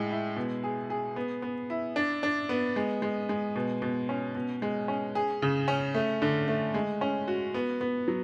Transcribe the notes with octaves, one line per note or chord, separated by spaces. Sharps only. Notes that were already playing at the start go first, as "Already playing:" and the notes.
Already playing: A2 G#3
E4
B2
G#4
G#4
B3
B3
E4
D4
D4
B3
G#3
G#3
G#3
B2
B2
C#4
B2
G#3
C#4
G#4
C#3
C#4
A3
D3
A3
G#3
C#4
F#4
B3
B3
F#3